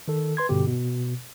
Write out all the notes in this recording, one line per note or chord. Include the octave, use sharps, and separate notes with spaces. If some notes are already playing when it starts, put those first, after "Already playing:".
D#3 A4
B4 C6 G#6
G2 B2 D3 G4
B2